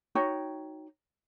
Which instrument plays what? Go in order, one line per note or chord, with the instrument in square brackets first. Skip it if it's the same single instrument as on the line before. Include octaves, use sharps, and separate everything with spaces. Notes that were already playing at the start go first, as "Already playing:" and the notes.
[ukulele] D#4 F#4 C#5 G5